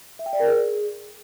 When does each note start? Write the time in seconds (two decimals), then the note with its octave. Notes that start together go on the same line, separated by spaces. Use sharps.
0.19 E5
0.26 G5
0.33 D5
0.40 A#4
0.47 G#4